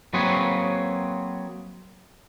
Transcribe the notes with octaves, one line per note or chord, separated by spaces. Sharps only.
F#3 A#3 C4 G#4 B4 C#5